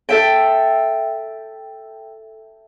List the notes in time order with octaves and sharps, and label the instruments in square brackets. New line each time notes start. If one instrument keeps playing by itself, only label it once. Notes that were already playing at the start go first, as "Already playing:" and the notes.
[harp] A4 E5 G5